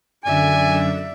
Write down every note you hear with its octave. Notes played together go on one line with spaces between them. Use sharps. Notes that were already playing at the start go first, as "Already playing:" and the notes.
F#2 D3 D5 E5 G#5